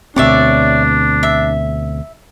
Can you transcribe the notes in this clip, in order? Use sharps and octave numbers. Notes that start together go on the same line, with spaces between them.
D2 B2 C4 D4 C#5 D5 E5
E5